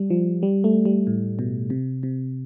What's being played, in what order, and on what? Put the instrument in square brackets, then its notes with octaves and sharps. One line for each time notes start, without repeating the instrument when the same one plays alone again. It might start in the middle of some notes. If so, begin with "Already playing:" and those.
Already playing: [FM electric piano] G3
F3
G3
A3
G3
A2
B2
C3
C3